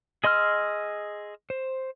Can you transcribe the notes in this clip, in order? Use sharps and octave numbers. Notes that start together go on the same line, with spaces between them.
G#4 D#5 C6 E6 F6
C5